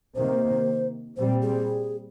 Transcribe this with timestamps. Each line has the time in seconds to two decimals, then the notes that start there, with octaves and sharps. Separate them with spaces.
0.15 C3 D#3 A#3 C5
1.16 A#2 G3 C4 C5
1.42 G#4